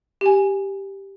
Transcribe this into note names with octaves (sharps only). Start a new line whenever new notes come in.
G4 G#5